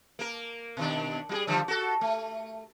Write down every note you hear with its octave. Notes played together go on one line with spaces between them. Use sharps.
A#3 A#4
B2 D#3 D4
G3 F#4 G#4
D3 F3 G3
F#4 A4
A3